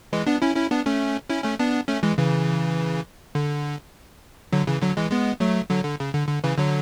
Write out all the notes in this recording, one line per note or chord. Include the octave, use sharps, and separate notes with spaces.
E3 G#3
B3 D4
C#4 E4
C#4 E4
B3 D4
A3 C#4
C#4 E4
A3 C#4
B3 D4
A3 C#4
E3 G#3
C#3 E3
D3
D3 F#3
C#3 E3
D3 F#3
E3 G#3
G#3 B3
F#3 A3
D3 F#3
D3
C#3
D3
D3
C#3 E3
D3 F#3